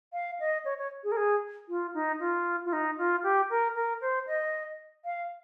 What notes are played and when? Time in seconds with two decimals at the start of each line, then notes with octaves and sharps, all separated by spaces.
0.13 F5
0.40 D#5
0.65 C#5
0.78 C#5
1.04 G#4
1.12 A#4
1.17 G#4
1.69 F4
1.94 D#4
2.20 F4
2.65 F4
2.73 D#4
2.98 F4
3.23 G4
3.50 A#4
3.75 A#4
4.01 C5
4.27 D#5
5.05 F5